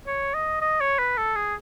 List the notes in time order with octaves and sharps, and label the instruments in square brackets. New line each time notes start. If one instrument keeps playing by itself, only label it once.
[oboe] C#5
D#5
D#5
C#5
B4
A4
G#4